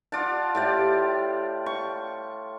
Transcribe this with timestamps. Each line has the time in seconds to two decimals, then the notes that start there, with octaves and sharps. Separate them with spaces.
0.12 F4 D5 F#5 A5
0.55 A2 G4 D5
1.66 C#6